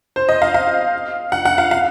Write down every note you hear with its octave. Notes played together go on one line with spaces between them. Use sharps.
C5
D#5
F5
F5
F#5
F#5
F5
F5